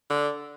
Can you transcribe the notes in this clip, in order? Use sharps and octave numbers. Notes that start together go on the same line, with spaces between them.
D3